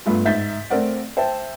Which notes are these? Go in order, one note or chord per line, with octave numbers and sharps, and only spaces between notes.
G2 A3 B3 F4
G#2 E5 G6 A6 B6
A3 C4 A#4 D5 F#5
C5 E5 G5 A5